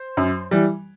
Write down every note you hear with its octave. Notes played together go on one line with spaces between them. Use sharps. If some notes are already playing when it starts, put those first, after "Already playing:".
Already playing: C5
F#2
E3 G3